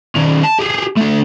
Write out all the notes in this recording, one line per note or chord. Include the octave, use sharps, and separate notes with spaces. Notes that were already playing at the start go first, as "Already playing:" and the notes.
D#3 C#4
A5
G4 G#4
A3 D4